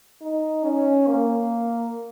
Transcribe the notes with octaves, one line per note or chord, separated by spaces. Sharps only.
D#4
C#4
A#3